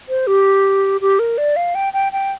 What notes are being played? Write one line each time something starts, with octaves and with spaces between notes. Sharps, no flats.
C5
G4
G4
A#4
D5
F5
G5
G5
G5